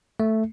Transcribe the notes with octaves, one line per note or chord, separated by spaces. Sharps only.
A3